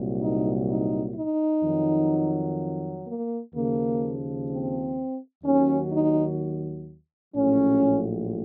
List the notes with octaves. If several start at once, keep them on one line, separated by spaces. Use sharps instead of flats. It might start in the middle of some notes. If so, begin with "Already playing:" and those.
Already playing: C2 A#2 F#3
D#4
D#4
D#4
F2 D#3 F#3
A#3
D#2 C#3 F3 A#3
C4
D#2 D#3 F#3 C#4
D#4
A#1 A2 F#3 C#4